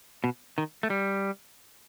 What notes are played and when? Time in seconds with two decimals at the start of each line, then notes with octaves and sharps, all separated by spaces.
0.24 B2
0.58 D#3
0.83 A3
0.90 G3